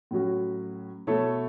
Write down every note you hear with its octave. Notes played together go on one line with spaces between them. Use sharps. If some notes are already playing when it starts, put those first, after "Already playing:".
A2 F#3 C#4 F#4
B2 A3 E4 A4 C#5